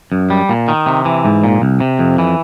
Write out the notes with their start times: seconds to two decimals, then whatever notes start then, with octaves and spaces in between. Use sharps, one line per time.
0.12 F#2
0.30 G3
0.49 A#2
0.68 D#3
0.86 C3
1.05 E3
1.25 G#2
1.44 A#2
1.62 C2
1.80 C3
1.99 F2
2.18 E3